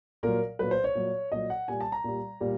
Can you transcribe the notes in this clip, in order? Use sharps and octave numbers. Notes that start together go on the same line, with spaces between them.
A#2 F#3 A#4
A#2 F#3 B4
C5
C#5
A#2 F#3
A#2 F#3 D#5
F#5
A#2 G3 G#5
A5
A#5
A#2 G3
A#2 G3